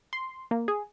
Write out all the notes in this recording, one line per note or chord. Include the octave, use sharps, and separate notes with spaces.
C6
A#3
G#4